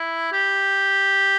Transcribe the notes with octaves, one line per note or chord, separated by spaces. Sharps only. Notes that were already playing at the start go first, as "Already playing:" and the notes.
Already playing: E4
G4